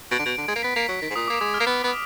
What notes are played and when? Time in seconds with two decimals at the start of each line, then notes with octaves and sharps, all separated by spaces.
0.11 B2 D7
0.19 D3
0.25 B2
0.38 D3
0.48 G#3
0.56 A#3
0.63 B3 B6
0.76 A#3
0.89 F#3
1.02 D#3
1.10 G#2
1.16 A#2 D#6
1.28 A#3 D6
1.41 G#3 D#6
1.54 F6
1.60 A#3
1.67 B3
1.84 B3